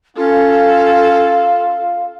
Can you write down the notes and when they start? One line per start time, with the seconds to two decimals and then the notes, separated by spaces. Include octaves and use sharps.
0.17 C#4 F4 A4 F5